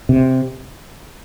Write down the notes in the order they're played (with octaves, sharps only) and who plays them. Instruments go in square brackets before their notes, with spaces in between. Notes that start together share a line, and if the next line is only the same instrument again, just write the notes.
[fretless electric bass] C3